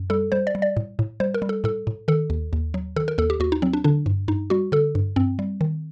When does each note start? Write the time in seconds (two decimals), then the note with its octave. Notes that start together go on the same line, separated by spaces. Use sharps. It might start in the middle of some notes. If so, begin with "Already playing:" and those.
Already playing: F#2
0.10 G3 A4
0.32 G3 C5
0.47 D5
0.55 G3
0.62 D5
0.77 A2
0.99 A2
1.20 G3 C5
1.34 A#4
1.42 G3
1.49 A4
1.64 A2 A4
1.87 A2
2.08 D#3 A4
2.30 D#2
2.53 D#2
2.74 F#3
2.96 D#3 A4
3.08 A#4
3.18 D#2 A4
3.30 G4
3.40 D#2 F#4
3.52 D#4
3.62 F#3 C4
3.73 D4
3.84 D3 D4
4.06 G2
4.28 G2 D#4
4.50 G3 F#4
4.72 D3 A4
4.95 G2
5.16 G2 C4
5.39 G3
5.61 D#3